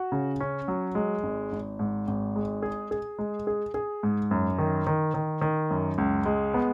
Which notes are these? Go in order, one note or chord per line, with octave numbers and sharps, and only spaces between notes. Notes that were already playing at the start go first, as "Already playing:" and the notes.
Already playing: F#4
C#3
C#4
F#3
G#3
G#1
G#1
G#2
G#1
G#3
G#4
G#4
G#3
G#4
G#4
G#2
F#2
D#3
D#3
D#3
D#3
F#2
C#2
G#3
B3